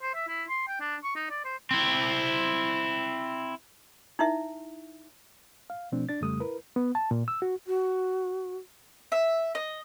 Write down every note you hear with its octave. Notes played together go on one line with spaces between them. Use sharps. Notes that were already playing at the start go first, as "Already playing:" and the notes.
C5
E5
E4
C6
G5
D4
C#6
D#4
D5
C5
C4 E4
D#4 E4 E5
F5
B2 F3 A3 C4 D4
D4 D5 A6
F2 C#3 G3 A3 D#6
E4 A#4 B4
B3
A5
A#2
E6
F#4
F#4
E5
D#5